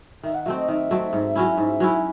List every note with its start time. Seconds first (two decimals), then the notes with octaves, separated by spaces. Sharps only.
0.23 D#3 E5
0.34 F#5
0.46 F#3 A3 C4 E5
0.58 D#5
0.68 D#3 E5
0.91 F#3 A3 C4
1.13 G#2
1.36 F#3 C#4 E4
1.58 G#2
1.80 F#3 C#4 E4